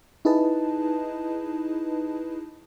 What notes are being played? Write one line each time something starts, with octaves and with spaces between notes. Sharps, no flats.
D#4 E4 G#4 B4 D#5 A5